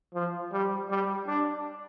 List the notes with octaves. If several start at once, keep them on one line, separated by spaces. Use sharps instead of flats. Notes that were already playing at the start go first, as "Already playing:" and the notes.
F3
G3
G3
D4